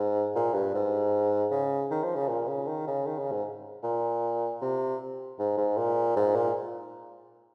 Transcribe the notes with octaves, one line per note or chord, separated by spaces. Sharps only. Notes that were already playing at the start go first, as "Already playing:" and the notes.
Already playing: G#2
A#2
G2
G#2
C#3
D#3
F3
C#3
A#2
C#3
D#3
C#3
D#3
C#3
G#2
A#2
C3
G#2
G#2
A#2
G#2
A#2